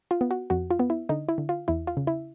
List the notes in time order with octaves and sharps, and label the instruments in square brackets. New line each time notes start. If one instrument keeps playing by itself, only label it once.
[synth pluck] F4
B3
F#4
F2 F#4
F4
B3
E4
D3 D#4
E4
D3
F4
E2 E4
F4
C#3
E4